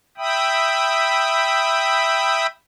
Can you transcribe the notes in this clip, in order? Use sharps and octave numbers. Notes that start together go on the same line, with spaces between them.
E5 G5 B5 D#6